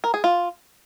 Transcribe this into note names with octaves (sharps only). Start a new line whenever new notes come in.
A#4
G#4
F4